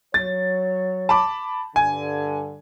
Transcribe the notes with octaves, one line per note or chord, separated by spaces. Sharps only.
F#3 C#5 A6
A5 B5 D6
G2 D3 G#5